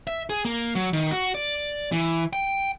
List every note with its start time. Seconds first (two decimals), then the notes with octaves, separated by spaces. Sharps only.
0.07 E5
0.30 G#4
0.45 A#3
0.75 F#3
0.93 D#3
1.11 F#4
1.35 D5
1.92 E3
2.33 G5